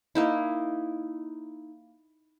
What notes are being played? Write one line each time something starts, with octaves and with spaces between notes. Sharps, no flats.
A#3 D#4 E4